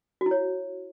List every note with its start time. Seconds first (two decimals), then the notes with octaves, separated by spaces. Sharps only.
0.21 F#4
0.26 E4
0.31 C#5